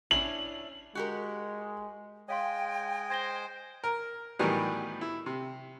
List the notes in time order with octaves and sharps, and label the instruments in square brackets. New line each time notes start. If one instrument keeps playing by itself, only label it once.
[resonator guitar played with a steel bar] C#4 D4 E4 [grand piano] F#7
[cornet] G#3 [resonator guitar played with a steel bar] F#4 G4 A#4
[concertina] G#3 D#5 G#5 [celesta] C#5 F5 C6 [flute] G5
[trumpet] C5 [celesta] G#6 A#6 G7
[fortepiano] A#4
A2 D#3 E3 F#3 G3 B3
E4
C3